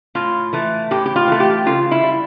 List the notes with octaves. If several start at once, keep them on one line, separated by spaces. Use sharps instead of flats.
A2 F4
E3 A3
A2 G4
G4
F4
E3 A3
G4
C#3 F4
E4
G3